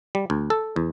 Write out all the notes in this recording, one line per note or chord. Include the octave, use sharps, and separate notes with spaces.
G3
D2
A4
E2